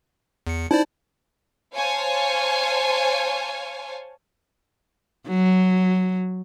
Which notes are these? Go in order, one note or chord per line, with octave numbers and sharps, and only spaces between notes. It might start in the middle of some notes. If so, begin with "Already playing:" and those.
E2 C#7
D#4 E4 C5 D5
C5 C#5 F5 G#5 A5
F#3